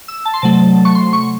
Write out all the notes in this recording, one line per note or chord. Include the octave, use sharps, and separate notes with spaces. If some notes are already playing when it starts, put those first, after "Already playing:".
E6
A5
C6
C3 F#3 A3 A5
C#6
C6
C#6